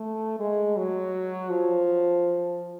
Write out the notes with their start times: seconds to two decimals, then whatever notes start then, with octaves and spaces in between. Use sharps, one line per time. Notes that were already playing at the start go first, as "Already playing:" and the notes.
Already playing: A3
0.40 G#3
0.77 F#3
1.50 F3